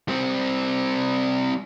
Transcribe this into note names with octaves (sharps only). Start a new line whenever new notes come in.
G3 C4